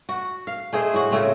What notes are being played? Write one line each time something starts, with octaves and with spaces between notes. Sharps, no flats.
F#4
F5
A3 G#4 C5 D#5
A2 F#4
C#3 A3 C4